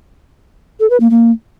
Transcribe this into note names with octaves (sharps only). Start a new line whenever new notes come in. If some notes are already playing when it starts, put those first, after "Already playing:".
A4
B4
A#3
A#3